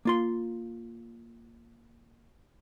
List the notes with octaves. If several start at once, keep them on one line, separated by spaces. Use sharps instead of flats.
A#3 F4 C6